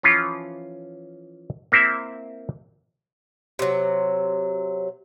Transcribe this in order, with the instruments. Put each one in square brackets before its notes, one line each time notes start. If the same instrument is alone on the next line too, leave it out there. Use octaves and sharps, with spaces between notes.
[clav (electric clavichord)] E3 F3 C#4 F4
A#3 C4 E4 C5 E5
[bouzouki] C3 F#3